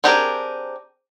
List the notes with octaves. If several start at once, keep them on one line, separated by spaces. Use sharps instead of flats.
C4 D4 G4 G#4 A#4